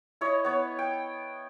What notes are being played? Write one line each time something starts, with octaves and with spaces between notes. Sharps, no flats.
E4 C#5 D#5
B3 C#5
G5